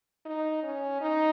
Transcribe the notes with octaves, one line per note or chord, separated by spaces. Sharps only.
D#4
C#4
D#4